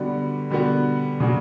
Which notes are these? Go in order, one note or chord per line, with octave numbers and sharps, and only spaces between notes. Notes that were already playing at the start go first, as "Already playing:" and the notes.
Already playing: D3 G3 B3 F#4
D3 G3 B3 F#4
C#3 F#3 A#3 D4 F#4